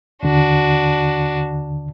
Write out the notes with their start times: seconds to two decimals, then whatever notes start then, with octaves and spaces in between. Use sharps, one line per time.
0.23 D#2 D3 D4 F#4